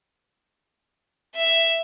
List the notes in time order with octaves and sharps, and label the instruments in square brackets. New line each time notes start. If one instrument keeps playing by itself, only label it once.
[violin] E5